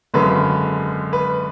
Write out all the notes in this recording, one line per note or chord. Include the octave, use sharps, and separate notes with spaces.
G#1 F#2 D3 G#3 B4
B4